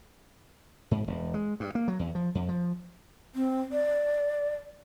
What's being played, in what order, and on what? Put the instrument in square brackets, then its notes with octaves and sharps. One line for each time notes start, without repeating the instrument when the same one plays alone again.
[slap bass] G#2
E1
G#3
G2
A#3
F#3
E2
F3
F2
F3
[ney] C4
D5